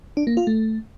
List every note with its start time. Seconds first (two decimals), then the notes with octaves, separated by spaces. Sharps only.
0.17 D4
0.27 A#3
0.37 F4
0.47 A3